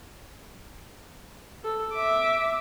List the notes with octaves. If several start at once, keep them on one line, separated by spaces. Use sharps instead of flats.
A4
E5 D6